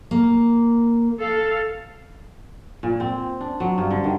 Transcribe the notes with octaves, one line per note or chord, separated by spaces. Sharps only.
A#3
A4 F5
A#2
C4
D4
F#3
G2
D3
D#3